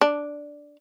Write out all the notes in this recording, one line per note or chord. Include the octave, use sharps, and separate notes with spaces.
D4